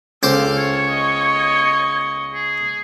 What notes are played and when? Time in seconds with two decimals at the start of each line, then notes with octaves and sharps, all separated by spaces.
0.23 C#2 A4 C5 F5 D6
0.57 C#5
0.90 D#5 C#6
2.34 G#4